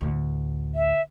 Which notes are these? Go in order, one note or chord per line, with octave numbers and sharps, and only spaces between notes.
A1 D2
E5